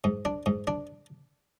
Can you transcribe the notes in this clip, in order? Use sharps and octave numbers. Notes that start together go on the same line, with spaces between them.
G#2
D4
G#2
D4